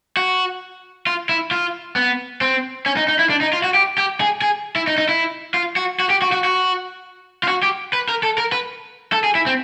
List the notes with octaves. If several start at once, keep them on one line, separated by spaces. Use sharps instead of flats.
F#4
F4
E4
F4
B3
C4
C#4
D#4
D#4
E4
D4
D#4
F4
F#4
G4
G4
G#4
G#4
E4
D#4
D#4
E4
F4
F#4
F#4
G4
F#4
F#4
F#4
F4
F#4
G4
B4
A#4
A4
A#4
B4
A4
G#4
E4
C4